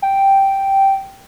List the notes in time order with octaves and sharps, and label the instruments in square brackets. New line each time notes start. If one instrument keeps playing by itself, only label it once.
[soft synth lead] G5